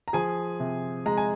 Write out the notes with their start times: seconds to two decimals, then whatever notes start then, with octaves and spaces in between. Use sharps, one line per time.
0.08 A#5
0.13 F3 G#4 G#5
0.60 C3
1.06 G#3 A#5
1.17 G#5